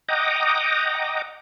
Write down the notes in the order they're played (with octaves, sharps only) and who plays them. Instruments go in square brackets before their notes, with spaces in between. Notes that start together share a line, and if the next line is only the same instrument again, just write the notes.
[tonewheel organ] D#5 F#5 G5 A#5 D6 D#6